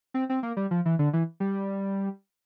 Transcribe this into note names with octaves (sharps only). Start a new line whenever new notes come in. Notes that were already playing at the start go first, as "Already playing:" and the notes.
C4
C4
A#3
G3
F3
E3
D3
E3
G3